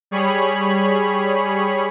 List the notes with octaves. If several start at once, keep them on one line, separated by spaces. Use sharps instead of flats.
G3 G#4 C#5 B5